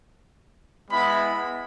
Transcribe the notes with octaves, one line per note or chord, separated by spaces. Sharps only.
G#3 B3 E4 B5